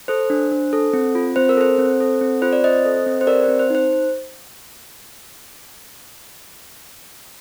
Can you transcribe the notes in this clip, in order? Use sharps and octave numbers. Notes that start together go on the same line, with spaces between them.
A4 C5
D4
D4
A4
C4
F4
C4 C5
A#4
A4 C5
C4
A4
C4
F4 C5
D5
C4 C5 D#5
A4
C4
C5
G4 A#4 D5
C4 C5
C5
D#4 C5